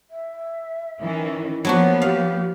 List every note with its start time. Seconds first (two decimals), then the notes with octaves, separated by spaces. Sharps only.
0.10 E5
0.99 D#3 E3 C#4
1.65 F3 F#3 A#3 B3 D4 F#4 C5
2.02 G4 F5